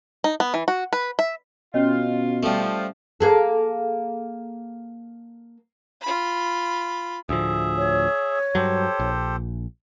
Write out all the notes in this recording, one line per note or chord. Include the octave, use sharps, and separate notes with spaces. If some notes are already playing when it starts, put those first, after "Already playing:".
D#4
B3
E3
F#4
B4
E5
B2 C#4 F4 C#5 D#5
F3 G3 A3
A#3 G#4 A4
F4 B5
D2 A2 F3 G#4 E5
C#5
G2 F#3 G4 A4 C5
A#1